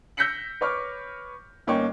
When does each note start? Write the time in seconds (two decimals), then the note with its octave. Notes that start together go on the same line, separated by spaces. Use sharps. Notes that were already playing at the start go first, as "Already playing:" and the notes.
0.17 E6 G6 A#6 B6 C#7 F#7
0.61 B4 C#5 C#6 D6 F6
1.67 G1 A#3 C#4 D#4 G5 C#6